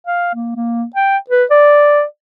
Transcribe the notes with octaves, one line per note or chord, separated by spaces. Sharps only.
F5
A#3
A#3
G5
B4
D5